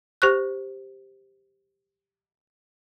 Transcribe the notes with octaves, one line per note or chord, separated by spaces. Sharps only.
G4 C5 C#6 F#6